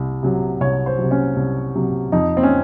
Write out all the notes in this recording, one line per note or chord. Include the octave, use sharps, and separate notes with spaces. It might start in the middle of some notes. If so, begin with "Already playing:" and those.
Already playing: C2
C3 F#3
C2 C#5
C5
C3 F#3
C#4
C2
C3 F#3
F2 D#4
C4
C#4